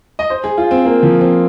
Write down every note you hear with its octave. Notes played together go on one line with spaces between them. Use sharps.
D#5
C5
G#4
F4
C4
A#3
F3
C4